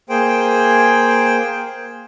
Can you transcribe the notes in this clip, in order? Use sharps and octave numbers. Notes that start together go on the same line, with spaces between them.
A#3 G#4 C5 G5